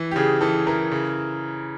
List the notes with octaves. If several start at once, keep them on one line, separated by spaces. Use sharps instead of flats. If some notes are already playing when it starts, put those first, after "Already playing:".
Already playing: E3
G4
C#3 G#4
E3 A4
E3 A#4
C#3